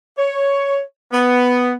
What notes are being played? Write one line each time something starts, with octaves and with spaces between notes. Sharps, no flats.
C#5
B3